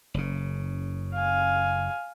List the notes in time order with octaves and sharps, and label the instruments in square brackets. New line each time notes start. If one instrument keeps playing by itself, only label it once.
[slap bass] F#1 C#3
[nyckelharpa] F5 G#5